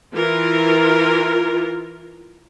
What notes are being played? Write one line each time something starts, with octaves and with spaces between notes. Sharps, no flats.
E3 F4 A#4